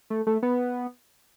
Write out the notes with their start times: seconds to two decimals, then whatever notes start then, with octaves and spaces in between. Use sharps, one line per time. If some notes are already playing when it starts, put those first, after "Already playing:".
0.10 A3
0.27 A3
0.42 B3